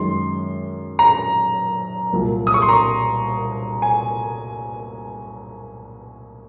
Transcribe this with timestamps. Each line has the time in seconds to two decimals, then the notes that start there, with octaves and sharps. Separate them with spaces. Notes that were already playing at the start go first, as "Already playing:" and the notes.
Already playing: F#2 D#3 G#3 C6
0.99 A#5
2.13 C2 A#2 F#3
2.47 D#6
2.54 C#6
2.62 C6
2.69 A#5
3.82 G#5